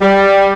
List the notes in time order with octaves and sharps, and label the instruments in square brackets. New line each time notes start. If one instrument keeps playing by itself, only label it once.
[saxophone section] G3